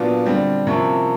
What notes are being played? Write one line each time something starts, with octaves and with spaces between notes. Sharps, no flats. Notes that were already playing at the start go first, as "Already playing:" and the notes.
Already playing: A#2 F#3 B3 D4 F4
D3 G3 C4
C3 F3 A#3 C#4 E4